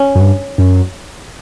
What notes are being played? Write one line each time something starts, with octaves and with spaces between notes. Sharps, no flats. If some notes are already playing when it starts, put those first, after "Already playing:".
Already playing: C#4
F#2
G2
F#2